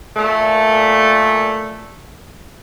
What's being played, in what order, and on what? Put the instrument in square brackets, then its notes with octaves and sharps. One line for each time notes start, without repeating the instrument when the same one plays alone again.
[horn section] A#2 A3